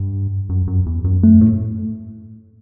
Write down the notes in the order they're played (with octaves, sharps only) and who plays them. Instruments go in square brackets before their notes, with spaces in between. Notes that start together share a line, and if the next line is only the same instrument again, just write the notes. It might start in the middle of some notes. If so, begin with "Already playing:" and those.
Already playing: [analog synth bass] G2
F#2
F#2
E2
F#2
[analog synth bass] F#2 [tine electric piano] A3
[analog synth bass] A2